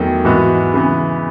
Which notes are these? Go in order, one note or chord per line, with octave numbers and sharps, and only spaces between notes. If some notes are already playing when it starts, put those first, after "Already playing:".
Already playing: E2 D#3 F#3 A3
G#2 E3 B3 F#4
C#3 E3 B3